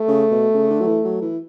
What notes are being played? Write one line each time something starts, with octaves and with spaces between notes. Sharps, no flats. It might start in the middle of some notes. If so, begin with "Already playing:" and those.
Already playing: A3
C#3
B2
C#3
D3
F#3
E3
F#3
E3